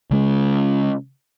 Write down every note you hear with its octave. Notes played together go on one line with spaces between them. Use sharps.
C#3 G#3 C#4